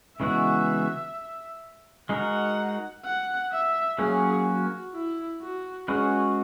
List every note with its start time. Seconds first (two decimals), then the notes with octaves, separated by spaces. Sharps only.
0.20 C#3 E3 G#3 B3 F#4 E5
2.09 G#3 D#4 F#4 A#4 F#5
3.04 F#5
3.52 E5
3.99 F#3 A#3 C#4 G#4
4.46 F#4
4.93 E4
5.41 F#4
5.88 G#3 C#4 F#4 G#4 B4